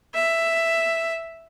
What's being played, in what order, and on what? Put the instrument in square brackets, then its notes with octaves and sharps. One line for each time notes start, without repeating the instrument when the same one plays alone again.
[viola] E5